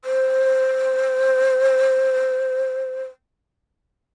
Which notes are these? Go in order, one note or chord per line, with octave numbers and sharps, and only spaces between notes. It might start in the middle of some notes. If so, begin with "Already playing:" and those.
C5